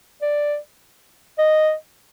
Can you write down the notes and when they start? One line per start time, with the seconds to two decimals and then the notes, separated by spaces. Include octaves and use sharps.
0.22 D5
1.38 D#5